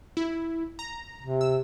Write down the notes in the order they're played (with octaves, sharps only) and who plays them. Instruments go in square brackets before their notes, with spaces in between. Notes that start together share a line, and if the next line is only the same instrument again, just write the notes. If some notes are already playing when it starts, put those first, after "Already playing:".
[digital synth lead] E4
A#5
[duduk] C3
[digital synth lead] E6